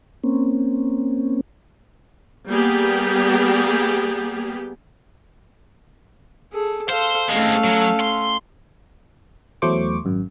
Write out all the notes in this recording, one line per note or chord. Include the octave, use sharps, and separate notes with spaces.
A#3 C4 C#4
G3 A#3 B3 G4 G#4
G#4 A4
A4 C5 F5
G#3 A3 C4 C#4 A4 F5
F#3
C6
E2 F#3 A3 C5 C#6 D6
G#1 F#2